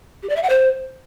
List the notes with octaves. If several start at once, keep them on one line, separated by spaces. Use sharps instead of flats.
G4
D5
E5
F#5
C5